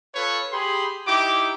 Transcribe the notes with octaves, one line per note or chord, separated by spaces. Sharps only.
F4 A4 B4 C#5
G4 G#4 B5 C6
D#4 E4 G4 D6